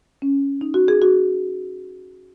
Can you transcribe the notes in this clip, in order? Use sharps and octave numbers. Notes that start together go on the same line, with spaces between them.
C#4
D#4
F#4
G#4
F#4